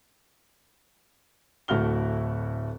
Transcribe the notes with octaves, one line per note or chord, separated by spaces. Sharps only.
D1 A3 E4 F#4 F6 G7